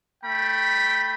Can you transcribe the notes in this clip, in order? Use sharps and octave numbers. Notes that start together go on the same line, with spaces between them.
A3 G5 B5